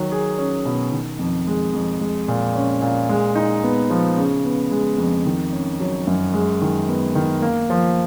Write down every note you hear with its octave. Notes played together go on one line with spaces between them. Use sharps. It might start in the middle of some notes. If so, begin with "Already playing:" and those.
Already playing: D#3 F#3
G#4
C#4
B2
D#3
F2
G#3
F2
G#3
A#2
C#4
A#2
G#3
D#4
B3
F3
C#3
B3
G#3
F2
D#3
C#4
F#3
F#2
G#3
D#3
B3
D#3
A#3
F3